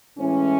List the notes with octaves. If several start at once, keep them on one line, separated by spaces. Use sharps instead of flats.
A2 E3 G#3 C#4